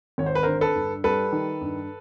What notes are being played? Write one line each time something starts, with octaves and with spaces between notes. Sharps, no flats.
G#1 C#5
C5
B4
D3 A#4 C5
A4 B4
G2
G3 A4 B4
D#3
G2